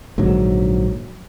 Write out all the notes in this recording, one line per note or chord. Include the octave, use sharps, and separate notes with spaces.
A#1 G#2 D3 F#3